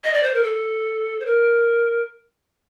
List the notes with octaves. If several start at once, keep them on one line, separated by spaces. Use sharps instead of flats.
D#5
D5
C5
A#4
A4
C5
A#4